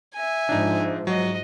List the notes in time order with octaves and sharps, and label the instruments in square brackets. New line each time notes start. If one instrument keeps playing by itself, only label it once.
[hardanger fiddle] E5 G#5
[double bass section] G#2 F3 [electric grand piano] D4 D#4
[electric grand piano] F#3 [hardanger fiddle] F#4 D#5